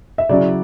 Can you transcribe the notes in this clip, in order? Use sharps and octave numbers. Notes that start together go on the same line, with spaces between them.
E5
C#3 F#3 C#4 E4 D5